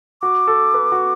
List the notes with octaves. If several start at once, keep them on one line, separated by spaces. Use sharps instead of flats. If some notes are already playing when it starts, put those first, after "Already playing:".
F#4 D6
A4
B4
F#4